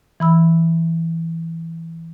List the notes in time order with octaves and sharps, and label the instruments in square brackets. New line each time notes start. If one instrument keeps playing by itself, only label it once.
[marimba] E3 B5 E6